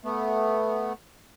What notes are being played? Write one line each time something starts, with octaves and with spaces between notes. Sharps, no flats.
A3 B3